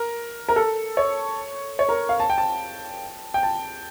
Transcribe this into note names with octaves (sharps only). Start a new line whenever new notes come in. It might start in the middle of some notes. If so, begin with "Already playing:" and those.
Already playing: A#4
A#4
A4
C#5
C#5
A#4
F5
A5
G5
A5
G5
A5